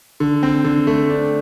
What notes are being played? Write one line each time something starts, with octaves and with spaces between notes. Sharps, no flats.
D3
C4
D3
A3
D4